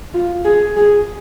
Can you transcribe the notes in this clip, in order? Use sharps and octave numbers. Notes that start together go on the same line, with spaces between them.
F4
G#4
G#4